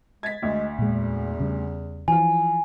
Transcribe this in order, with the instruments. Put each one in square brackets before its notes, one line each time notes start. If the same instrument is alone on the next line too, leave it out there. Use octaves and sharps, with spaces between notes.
[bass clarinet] G#3 [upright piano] G#6 A6 B6
[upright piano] D2 [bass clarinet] G#3
[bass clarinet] E2 [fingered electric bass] A#2 G#3
[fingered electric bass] C#3 G3
[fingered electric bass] E3 [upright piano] F3 F4 [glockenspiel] G#5